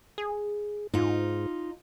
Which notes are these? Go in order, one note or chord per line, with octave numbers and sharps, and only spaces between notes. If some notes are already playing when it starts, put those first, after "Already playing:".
G#4
G#2 D#4 F4